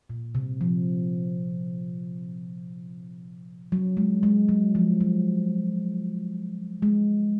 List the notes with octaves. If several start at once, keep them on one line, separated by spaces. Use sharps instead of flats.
A#2
C3
F3
F#3
G#3
G#3
F#3
F3
F#3
G#3